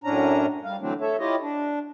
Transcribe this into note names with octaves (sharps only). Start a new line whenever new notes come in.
F#2 A2 C#4 D4 A#5
G3 F5
D3 E3 F#3 A3 C4 D4
A4 C#5 E5
E4 F4 G4 C#5 D#5
D4